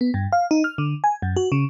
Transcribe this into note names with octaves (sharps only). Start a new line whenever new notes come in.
B3
G2
F5
D#4
F6
D3
G#5
F#2
F#4
C#3